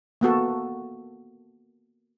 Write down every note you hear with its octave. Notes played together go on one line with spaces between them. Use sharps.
A#3 B3 F#4 A4